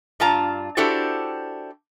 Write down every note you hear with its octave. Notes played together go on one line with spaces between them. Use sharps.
G2 D4 F4 A5 A#5
D4 E4 F#4 G4 A4 C5